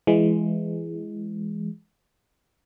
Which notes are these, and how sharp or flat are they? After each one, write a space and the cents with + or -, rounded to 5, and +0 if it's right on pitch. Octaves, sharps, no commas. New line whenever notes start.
E3 +20 G#3 +0